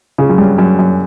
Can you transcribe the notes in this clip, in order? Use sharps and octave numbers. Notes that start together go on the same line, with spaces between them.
C#3
F#2
G2
F#2
F#2